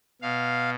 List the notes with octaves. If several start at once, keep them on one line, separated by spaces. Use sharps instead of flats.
B2 F5